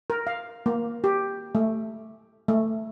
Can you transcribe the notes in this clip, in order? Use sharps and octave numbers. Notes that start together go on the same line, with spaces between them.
A#4
F5
A#3
G4
A3
A3